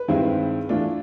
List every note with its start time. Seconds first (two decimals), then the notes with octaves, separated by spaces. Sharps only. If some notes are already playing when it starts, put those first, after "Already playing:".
Already playing: B4
0.08 G2 D#3 G#3 C4 E4
0.69 E3 A3 D4 F4